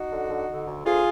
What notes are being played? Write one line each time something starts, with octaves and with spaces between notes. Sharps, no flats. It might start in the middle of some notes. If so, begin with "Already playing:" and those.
Already playing: D#4 F#4
D3
D3
D3
D2
D2 F4 G#4